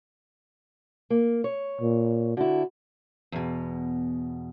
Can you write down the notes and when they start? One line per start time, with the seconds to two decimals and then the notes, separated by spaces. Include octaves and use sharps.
1.10 A#3
1.44 C#5
1.81 A#2
2.37 D3 E4 F#4
3.32 E2 B2